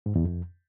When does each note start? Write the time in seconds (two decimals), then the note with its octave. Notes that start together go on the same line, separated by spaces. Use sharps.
0.06 G#2
0.16 E2
0.25 F2